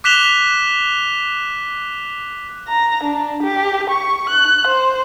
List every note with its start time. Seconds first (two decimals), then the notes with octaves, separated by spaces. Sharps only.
0.04 D6 F#6 B6 E7 F7 G7
2.69 A#5
3.04 D4
3.43 G4
3.90 C#6
4.30 F#6
4.68 C5